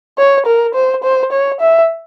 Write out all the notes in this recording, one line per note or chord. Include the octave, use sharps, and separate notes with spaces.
C#5
A#4
C5
C5
C#5
E5